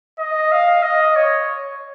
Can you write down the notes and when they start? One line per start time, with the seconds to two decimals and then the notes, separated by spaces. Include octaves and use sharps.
0.19 D#5
0.52 F5
0.83 D#5
1.16 C#5